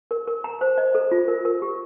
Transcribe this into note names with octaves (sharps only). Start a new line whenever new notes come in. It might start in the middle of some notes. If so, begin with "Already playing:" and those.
A#4
A#4
A#5
C5
D#5
A4
F4
A#4
A#4
G4